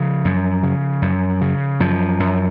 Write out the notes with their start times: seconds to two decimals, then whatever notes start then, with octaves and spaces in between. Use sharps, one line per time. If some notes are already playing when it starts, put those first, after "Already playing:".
Already playing: C#3 F3
0.25 F#2
0.63 C#3
1.02 F#2
1.41 C#3
1.80 F#2 F3
2.20 F#2